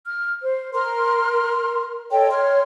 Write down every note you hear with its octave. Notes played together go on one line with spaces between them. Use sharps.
F6
C5
A#4 C6 F6
A4 C#5 D#5 G5
C#5 C6 F6